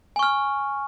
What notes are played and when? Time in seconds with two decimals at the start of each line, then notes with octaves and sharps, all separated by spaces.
0.16 G#5
0.19 C#6
0.23 F6